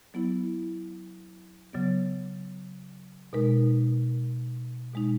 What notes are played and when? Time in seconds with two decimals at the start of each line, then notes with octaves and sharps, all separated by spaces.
0.14 F#3 B3 E4
1.73 C#3 F#3 B3
3.33 B2 G#3 D#4 A#4
4.94 B2 G#3 D#4